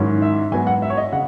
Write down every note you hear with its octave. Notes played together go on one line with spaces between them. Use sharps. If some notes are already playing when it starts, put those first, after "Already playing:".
Already playing: G#2 D#3 F#3 C#4 E4
E5
G#2 F#3 B3 G#5
F#5
E5
C#5
D#5
C#3 F#5